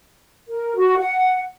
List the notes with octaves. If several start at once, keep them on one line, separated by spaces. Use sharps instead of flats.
A#4
F#4
F#5